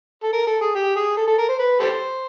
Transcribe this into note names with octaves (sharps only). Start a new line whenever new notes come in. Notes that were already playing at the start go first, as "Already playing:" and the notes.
A4
A#4
A4
G#4
G4
G#4
A4
A4
A#4
C5
B4
G4 A4 C5